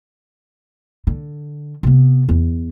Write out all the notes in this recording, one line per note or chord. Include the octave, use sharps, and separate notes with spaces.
D3
C3 B3
E2